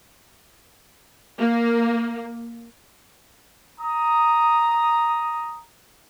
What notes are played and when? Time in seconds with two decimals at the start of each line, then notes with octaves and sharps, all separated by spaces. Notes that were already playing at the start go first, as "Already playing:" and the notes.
1.38 A#3
3.80 A#5 D#6